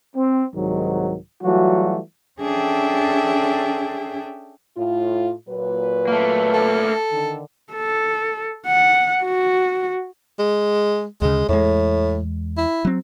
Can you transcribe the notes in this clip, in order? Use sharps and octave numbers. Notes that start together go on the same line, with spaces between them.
C4
C2 G#2 D#3 F#3
E3 F#3 G3 A3 F4 F#4
C#4 D4 G#4 A4 E5 G5
A2 F4
A#2 F#3 B4
A3 A#3
A4
D3 D#3
A4
F#5
F#4
G#3
D2 C#3 G#3
E2 A2 G#3
E4
F#3 C4